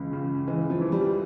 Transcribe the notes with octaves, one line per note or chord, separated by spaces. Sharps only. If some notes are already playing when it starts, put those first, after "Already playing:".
Already playing: C#2 C#3 E3
C#3
E3 G#3
F3
E3
G3